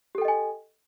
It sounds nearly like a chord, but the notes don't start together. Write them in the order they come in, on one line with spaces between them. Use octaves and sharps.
G4 A4 G5 D#5 G#5